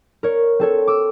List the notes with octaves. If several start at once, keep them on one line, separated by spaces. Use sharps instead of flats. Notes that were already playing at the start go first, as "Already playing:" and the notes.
A#4 C#5
C4 A4 C#5
D6 E6